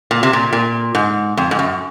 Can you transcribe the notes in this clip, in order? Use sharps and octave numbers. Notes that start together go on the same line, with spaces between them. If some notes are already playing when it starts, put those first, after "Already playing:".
A#2
C3
A#2
A#2
G#2
F2
G#2
F#2